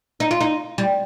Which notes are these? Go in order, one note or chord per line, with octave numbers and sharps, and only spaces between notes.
D#4
F4
D#4
G3